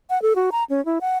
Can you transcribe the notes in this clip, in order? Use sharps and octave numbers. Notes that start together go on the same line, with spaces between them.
F#5
A4
F#4
A#5
C#4
E4
F#5